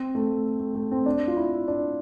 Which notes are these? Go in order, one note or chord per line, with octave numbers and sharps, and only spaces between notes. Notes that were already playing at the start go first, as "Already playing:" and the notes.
Already playing: C4
A3
A3
A3
C4
D4
F4
E4
D4